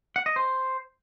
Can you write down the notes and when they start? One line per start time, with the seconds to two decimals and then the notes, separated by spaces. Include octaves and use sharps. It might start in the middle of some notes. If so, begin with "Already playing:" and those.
0.16 F#5
0.26 D#5
0.36 C5